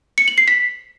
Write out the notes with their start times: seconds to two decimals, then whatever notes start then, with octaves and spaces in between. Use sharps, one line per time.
0.18 C#7
0.28 F#7
0.38 C7
0.48 B6